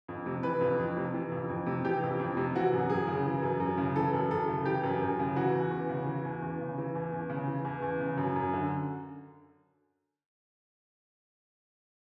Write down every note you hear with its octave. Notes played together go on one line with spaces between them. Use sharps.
F2
C3
E3 B4
F2
F2
C3
E3
F2
F2
C3
E3 G4
F2
F2
C3
E3 F#4
F#2
F#2 G#4
C#3
E3
F#2
F#2
C#3
E3 A4
F#2
F#2 A4
C#3
E3 G4
F#2
F#2
C#3
E3 F#4
E2
E2
C#3
E3
E2
E2
C#3
E3
E2
E2
C#3
E3
E2
E2
C#3
F#2
F#2
D3